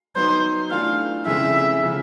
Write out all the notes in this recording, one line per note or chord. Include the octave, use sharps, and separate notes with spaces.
F#3 B3 D#4 C5
E3 A3 D4 F4 A4 F5
F2 C#3 E3 G#3 C4 E5
C#3 F3